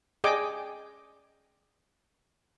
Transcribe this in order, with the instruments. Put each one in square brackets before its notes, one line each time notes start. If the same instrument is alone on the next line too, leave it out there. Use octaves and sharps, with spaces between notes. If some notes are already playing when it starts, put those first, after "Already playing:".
[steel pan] G#4 D5 D#5 G5 G#5 D6